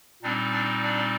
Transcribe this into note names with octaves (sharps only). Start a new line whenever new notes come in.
A#2 G3 C4 D4 D#4 D5
D4 D5
D4 D5